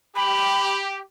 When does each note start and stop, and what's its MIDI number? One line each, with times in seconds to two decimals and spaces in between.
0.16 0.99 67
0.16 0.76 83